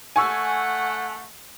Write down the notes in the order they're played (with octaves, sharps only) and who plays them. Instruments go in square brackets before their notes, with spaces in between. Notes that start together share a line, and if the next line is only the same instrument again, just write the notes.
[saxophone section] A3 F#5 [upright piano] G#5 C#6 E6